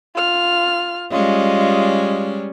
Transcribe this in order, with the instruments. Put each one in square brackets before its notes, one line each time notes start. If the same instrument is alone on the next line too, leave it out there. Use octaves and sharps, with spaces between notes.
[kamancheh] F4 F6
[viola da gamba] G3 G#3 C#4 [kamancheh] F4 D#5